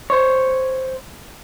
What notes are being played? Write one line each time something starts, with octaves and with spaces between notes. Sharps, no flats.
C5 C#5